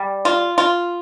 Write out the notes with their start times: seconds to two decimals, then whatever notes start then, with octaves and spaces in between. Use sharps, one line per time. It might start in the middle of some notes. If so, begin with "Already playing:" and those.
Already playing: G3
0.25 F4
0.58 F4